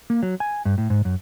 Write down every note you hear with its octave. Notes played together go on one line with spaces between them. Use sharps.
A#3
F#3
G#5
G2
A2
G#2
F#2